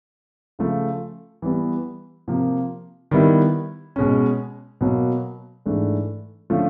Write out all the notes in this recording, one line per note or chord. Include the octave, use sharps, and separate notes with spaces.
C#3 F3 A3
E3 G3 B3
C3 F3 A#3
D#3 G3 B3 E4
B2 G#3 C#4
B2 F#3 A#3
G#2 E3 A3 D4
D3 F3 A3 C#4 F4